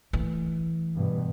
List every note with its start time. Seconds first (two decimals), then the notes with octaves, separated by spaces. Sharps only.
0.13 E3 A3
0.96 G2 B2